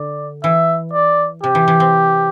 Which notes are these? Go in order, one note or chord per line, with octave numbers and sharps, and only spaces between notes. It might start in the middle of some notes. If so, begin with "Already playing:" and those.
Already playing: D3 D5
E3 E5
D5
C3 G4
E3
E3
C4